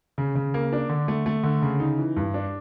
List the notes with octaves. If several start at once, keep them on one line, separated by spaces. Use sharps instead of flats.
C#3
C#3
A#3
D4
D3
A3
A3
D3
C#3
D#4
E3
G2
D4